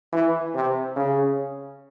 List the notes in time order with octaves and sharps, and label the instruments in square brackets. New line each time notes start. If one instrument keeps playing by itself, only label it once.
[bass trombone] E3
C3
C#3